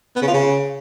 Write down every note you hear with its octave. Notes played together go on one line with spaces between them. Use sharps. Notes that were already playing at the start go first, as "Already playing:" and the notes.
B3
C#3
F4
C#3